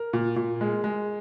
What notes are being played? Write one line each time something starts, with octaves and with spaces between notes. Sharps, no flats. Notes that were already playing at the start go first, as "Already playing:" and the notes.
Already playing: A#4
A#2
A#2
G#3
G#3